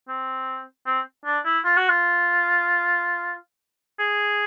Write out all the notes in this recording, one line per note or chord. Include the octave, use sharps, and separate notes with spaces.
C4
C4
D4
E4
F4
F#4
F4
G#4